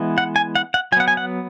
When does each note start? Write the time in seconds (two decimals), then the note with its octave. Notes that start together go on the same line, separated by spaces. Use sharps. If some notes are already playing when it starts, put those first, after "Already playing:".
Already playing: E3 G#3 B3
0.18 F#5
0.36 G#5
0.55 F#5
0.74 F#5
0.92 F#3 G#5
0.97 B3 F#5
1.08 G#5
1.17 F#5